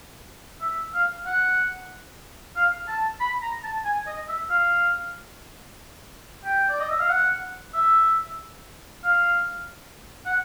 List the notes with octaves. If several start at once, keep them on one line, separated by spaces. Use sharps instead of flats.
E5
F5
F#5
F5
A5
B5
A#5
A5
G#5
D#5
E5
F5
G5
D5
D#5
E5
F5
F#5
E5
F5
F#5